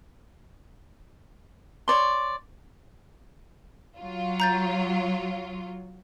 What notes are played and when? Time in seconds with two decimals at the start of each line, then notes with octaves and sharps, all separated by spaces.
1.88 C#5 D5 C6
3.99 F#3 F4
4.40 A#5 G6 A6